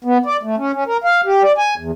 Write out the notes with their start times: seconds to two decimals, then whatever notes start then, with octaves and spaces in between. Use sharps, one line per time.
0.04 B3
0.26 D5
0.43 A3
0.57 C#4
0.73 C#4
0.87 A#4
1.04 F5
1.25 G4
1.43 D5
1.58 G#5
1.78 E2